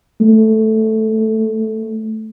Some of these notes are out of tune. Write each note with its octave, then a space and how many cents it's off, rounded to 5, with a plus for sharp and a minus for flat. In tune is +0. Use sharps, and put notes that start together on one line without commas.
A3 -5